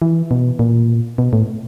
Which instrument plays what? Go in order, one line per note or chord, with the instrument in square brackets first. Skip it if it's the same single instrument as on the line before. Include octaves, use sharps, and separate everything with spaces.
[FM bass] E3
B2
A#2
B2
A2